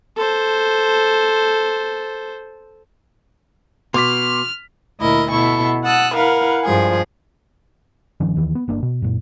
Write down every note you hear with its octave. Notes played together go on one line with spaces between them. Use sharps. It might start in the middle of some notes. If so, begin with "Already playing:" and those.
A4 C5
B2 C6 D6 F6 B6
D2 A#2 E4 A#4 D#5
B2 E4 A4 C#6
F#5 A5 D#6 E6 F#6
E4 A#4 B4 F5 F#5
G2 F3 G#3 G#4
G1 D#3 F3 C#4
D#2 D#3 E3
B3
G1 A#3 D4
B2
F#2 A#2